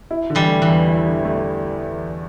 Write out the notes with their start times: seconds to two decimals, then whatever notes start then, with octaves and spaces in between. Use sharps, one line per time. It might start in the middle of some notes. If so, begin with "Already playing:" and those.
0.11 E4
0.30 D3
0.35 E3 G3
0.48 A3
0.62 E3
0.68 E2
0.87 E4
1.06 D3
1.25 A3